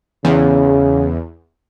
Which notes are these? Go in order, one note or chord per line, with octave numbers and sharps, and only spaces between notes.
E2 C#3